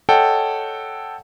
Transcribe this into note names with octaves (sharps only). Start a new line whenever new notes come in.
A4 C#5 D#5 F#5 G5